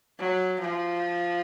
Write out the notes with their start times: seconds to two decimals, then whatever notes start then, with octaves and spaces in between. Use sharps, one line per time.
0.19 F#3
0.60 F3